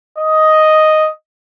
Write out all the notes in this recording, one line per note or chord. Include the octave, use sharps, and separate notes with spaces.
D#5